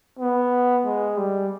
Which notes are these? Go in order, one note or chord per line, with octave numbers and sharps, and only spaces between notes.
B3
G#3
G3